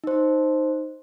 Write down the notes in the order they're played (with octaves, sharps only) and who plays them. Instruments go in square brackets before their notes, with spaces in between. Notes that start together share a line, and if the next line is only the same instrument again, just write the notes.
[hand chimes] D#4 C5